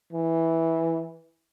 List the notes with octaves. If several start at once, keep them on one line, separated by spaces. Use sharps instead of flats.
E3